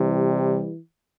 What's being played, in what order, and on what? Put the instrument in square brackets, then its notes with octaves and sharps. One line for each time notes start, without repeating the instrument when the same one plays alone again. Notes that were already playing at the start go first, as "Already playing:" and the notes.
Already playing: [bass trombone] C3 [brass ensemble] E3 G3